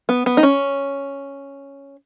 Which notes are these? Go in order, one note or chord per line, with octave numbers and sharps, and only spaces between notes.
B3
B3
D#4
C#4